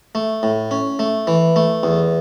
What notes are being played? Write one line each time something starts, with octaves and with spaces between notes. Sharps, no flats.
A3
A2
C#4
A3
E3
A3
E2